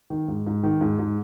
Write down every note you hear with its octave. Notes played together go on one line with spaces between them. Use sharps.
D#3
G#2
G#2
D#3
G#2
G#2